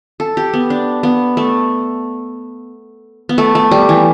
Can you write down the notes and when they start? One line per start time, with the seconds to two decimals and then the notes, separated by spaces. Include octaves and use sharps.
0.20 A4
0.37 G4
0.53 B3
0.70 D4
1.03 B3
1.37 A3
3.29 B3
3.38 A3
3.55 A3
3.71 G3
3.89 E3